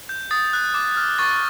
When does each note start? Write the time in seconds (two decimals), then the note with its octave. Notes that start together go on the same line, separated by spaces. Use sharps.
0.09 G6
0.31 D#6 A6
0.53 F#6
0.74 D6
0.97 F6
1.18 C#6 A6